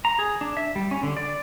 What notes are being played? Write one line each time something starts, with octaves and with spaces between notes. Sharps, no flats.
A#5
G#4
D4
E5
G3
C#4
D3
D5